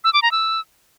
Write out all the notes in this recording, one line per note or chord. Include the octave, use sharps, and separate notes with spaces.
E6
D6
A#5
E6